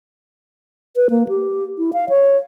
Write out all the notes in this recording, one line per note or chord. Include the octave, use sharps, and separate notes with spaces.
B4
A#3
G4
E4
F5
C#5